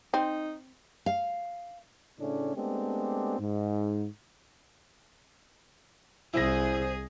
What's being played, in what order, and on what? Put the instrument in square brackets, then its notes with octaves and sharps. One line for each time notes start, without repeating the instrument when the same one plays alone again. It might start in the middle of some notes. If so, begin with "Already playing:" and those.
[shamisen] C4 [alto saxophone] D#4
[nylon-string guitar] F5
[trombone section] A2 C#3 A3 C#4 D4
G#3 A3 B3 C4 D4 G4
G#2
[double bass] C2 [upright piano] E4 A#6 [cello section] G#4 [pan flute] C5